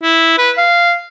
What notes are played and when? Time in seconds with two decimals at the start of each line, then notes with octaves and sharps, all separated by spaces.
0.02 E4
0.38 B4
0.57 F5